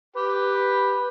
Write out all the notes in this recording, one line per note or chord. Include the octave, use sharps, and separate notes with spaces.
G4 B4